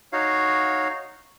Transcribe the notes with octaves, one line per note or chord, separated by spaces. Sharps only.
D#4 F#4 C#5 F5